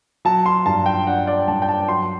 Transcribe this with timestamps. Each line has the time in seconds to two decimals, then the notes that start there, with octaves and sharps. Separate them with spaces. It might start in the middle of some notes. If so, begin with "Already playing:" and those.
0.25 F#3 A5
0.46 C6
0.66 G2 A5
0.86 G5
1.07 D4 F#5
1.27 D5
1.48 G2 A5
1.62 G5
1.69 A5
1.88 F#3 C6